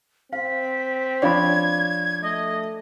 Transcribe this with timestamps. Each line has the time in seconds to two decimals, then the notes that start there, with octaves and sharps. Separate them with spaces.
0.33 C4 F5 B6
1.22 F3 D4 C#5 D5 F5 B5 G#6
2.22 A3 D#5